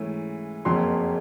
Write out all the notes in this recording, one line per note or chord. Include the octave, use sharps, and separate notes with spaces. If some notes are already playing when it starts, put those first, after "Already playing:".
Already playing: G#2 E3 A3 C#4
F#1 F2 C#3 F#3 A#3 C6